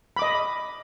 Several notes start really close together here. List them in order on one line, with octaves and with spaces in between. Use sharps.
B5 D6 D#5